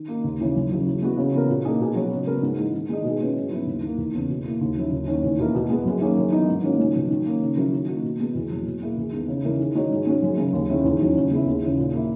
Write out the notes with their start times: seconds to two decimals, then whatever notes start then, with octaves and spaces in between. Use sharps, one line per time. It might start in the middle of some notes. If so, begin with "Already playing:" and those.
Already playing: D#3
0.08 A#3 D#4
0.24 D#2
0.40 C#3 E3 G#3
0.56 F#2
0.71 C#3 F#3
0.87 E3
1.02 G#3 B3 F#4
1.17 C#3
1.34 E3 B3 F#4 A#4
1.49 A#2
1.65 A#3 D#4 G#4
1.80 B2
1.96 F#3 B3
2.11 C#3
2.27 G#3 B3 F#4 A#4
2.42 G#2
2.58 E3 G#3 D#4
2.74 D#3
2.89 G#3 D#4 G#4 D#5
3.04 B2
3.20 G#3 C#4 E4 B4
3.36 G#2
3.51 D#3 F#3 B3 E4
3.67 D#2
3.83 D#3 A#3
3.98 E2
4.14 C#3 E3 B3
4.30 B2
4.45 A#3 E4
4.61 D#2
4.77 D#3 F#3 C#4 E4
4.92 D#2
5.07 D#3 A#3 C#4
5.23 E2
5.38 B2 A#3 E4 A#4
5.54 B2
5.70 G#3 B3
5.85 F#2
6.01 D#3 A#3 C#4 G#4
6.17 F#2
6.32 E3 B3 D#4
6.48 G#2
6.63 D#3 A#3 C#4 F#4
6.79 C#2
6.95 B2 F#3
7.10 D#3
7.26 A#3 C#4
7.41 C#3
7.57 F#3 C#4 E4 A#4
7.72 D#3
7.88 A#3 D#4 F#4
8.03 B2
8.19 G#3 B3 F#4
8.35 E2
8.51 B2 F#3
8.66 B2
8.82 A#3 E4 G#4
8.98 E2
9.13 D#3 G#3 B3
9.28 C#3
9.44 E3 G#3 D#4 A#4
9.59 D#3
9.75 G#3 D#4 F#4 C#5
9.91 G#2
10.07 D#3 G#3 C#4 F#4
10.22 F#2
10.38 C#3 G#3
10.53 D#2
10.69 D#3 G#3 C#4 E4
10.84 E2
11.00 D#3 F#3 C#4
11.16 C#3
11.31 G#3 B3 E4
11.46 D#2
11.63 C#3 E3
11.77 A#2
11.93 A#3 E4